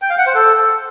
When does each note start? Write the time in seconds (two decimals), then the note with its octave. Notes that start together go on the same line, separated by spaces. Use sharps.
0.02 G5
0.10 F5
0.18 F#5
0.26 C5
0.35 A4